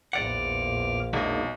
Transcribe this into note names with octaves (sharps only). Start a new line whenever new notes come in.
A#1 E2 A#2 D5 F#5 D6 F6
B1 E2 G#3 A#3 D4 D#4